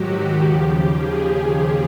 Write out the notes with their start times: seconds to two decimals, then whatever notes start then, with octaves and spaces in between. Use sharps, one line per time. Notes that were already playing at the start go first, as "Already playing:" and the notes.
Already playing: G#2 D#3 F#3 F#4 G4
0.37 D#2 C#3 F3 G4
0.93 G#4